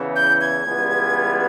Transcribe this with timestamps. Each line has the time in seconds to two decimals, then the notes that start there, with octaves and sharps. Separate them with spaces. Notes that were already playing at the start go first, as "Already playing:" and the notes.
Already playing: E2 C#3 E3
0.16 G6
0.41 G#6
0.66 C#2 C#3 E3 G3 B3